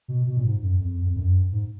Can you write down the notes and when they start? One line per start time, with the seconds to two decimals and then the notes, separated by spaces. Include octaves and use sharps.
0.08 B2
0.27 B2
0.37 A#2
0.45 G#2
0.62 F#2
0.80 F2
1.06 F2
1.16 F#2
1.52 G#2